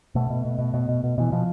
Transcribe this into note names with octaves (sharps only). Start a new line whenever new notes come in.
B2 A3
B2
B2
B2
B2
B2
B2
B2 E3
B2 F3